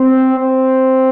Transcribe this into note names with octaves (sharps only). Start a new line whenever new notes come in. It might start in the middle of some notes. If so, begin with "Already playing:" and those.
Already playing: C4
C4